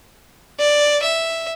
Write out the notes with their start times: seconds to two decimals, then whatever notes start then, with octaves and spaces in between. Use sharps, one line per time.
0.59 D5
1.03 E5